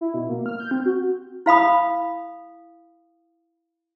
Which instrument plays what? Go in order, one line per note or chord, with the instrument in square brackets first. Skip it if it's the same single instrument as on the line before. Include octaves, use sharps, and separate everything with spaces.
[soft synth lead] E4
B2
A#3
F6
G6
C4
F#4
[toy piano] E4 F5 B5 D#6